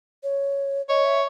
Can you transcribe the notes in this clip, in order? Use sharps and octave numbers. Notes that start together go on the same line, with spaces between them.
C#5
C#5 D#5
E5